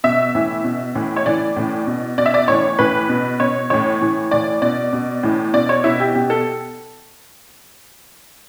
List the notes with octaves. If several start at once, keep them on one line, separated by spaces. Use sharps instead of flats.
B2 E5
A2 E3
B2
A2 E3
C#5
A2 E3 D5
A2 E3
B2
B2 D5
E5
D5
A2 E3 C#5
A2 E3 B4
B2
B2 C#5
A2 E3 C#5
A2 E3
A2 E3 D5
B2 D5
B2
A2 E3
B2 D5
C#5
B2 E4
G4
B2 G4
A4